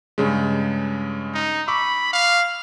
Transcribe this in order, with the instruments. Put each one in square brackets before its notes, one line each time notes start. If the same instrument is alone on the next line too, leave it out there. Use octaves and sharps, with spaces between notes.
[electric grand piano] G2 C#3 G#3
[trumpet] D#4
[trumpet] B5 [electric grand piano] C#6 D6 E6
[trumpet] F5